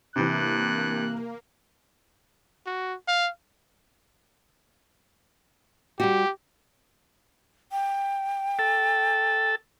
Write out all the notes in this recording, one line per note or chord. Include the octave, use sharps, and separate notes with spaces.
G2 C3 E3 A#3 F#6
F#4
F5
G3 F#4 G4
G5
A4